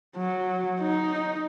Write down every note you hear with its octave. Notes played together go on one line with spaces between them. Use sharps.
F#3
D#4